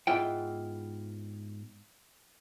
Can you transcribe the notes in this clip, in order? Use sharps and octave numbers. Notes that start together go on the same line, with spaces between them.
G#2 B3 E4 F4 G5